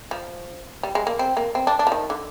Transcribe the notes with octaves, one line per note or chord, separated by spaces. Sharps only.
F3
G3
G#3
A#3
C4
A#3
C4
D4
D4
F3
D#3
D3